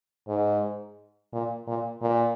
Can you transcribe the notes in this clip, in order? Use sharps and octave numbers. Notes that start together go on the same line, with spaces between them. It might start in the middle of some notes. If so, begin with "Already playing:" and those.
G#2
A#2
A#2
A#2